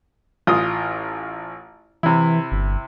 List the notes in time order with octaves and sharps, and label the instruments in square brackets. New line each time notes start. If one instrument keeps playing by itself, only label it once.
[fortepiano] A1 F4 D#6
[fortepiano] C3 E4 [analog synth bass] E3
[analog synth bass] G1